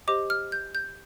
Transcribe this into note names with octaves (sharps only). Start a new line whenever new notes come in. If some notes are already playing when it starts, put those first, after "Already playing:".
G4 C5 D#5 D6
F6
G6
G6